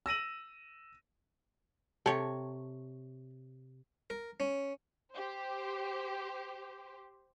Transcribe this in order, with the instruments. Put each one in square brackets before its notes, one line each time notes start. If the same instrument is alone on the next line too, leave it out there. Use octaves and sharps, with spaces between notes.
[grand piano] E6 A#6 D#7 F#7
[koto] C3 C#5 [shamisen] A4
[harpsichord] A#4
C#4
[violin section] G4 C5